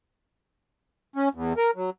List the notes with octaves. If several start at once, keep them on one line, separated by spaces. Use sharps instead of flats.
C#4
E2
A#4
F#3